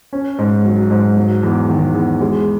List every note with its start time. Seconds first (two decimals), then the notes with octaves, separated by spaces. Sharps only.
0.13 C#4
0.38 G#2
0.65 F#3
0.91 G#2
1.17 F#3
1.43 E2
1.69 D#3
1.95 E2
2.21 G#3